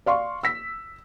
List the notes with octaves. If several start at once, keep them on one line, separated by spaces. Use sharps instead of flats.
D5 F5 C6 C#6
E6 B6